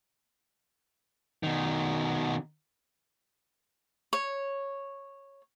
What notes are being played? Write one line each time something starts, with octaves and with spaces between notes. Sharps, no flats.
B2 D#3
C#5